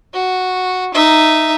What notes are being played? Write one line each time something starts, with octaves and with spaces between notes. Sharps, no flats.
F#4
D#4 E5